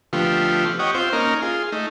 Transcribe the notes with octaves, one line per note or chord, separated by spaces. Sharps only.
D3 F3 A3 B3 F4 G4
G4 C#5 D#5 F#5
C4 F4 C5
A#3 C#4 D#4 A#4
F4 G#4
A3 D#4